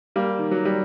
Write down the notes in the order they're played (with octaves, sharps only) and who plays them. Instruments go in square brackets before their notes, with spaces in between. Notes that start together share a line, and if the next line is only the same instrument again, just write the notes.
[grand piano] G3 A#3
D#3
F#3
G3